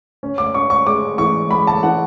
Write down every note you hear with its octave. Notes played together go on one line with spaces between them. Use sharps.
C#4
D6
C#4 C#6
C#6
G#3 D6
E3 C#6
G#3 B5
A5
E3 F#5